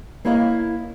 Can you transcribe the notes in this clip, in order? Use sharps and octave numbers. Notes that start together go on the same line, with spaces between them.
A#3 E4 C#5 D#5 F5